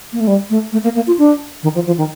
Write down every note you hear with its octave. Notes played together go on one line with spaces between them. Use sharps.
A#3
A3
G3
A3
A3
A#3
A#3
F4
D4
D#3
F3
F3
D#3